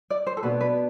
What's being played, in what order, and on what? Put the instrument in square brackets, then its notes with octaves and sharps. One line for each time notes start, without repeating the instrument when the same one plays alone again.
[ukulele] D5
C5
A4
[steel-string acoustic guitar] B2 B3 D4 [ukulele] B4
[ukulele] B4